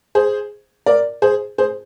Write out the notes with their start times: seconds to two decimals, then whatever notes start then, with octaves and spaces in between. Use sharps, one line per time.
0.15 G#4 C5
0.86 A#4 D5
1.22 G#4 C5
1.58 G#4 C5